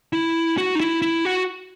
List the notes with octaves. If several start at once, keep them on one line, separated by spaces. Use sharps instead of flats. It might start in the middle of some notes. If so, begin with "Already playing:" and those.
E4
F#4
D#4
E4
E4
F#4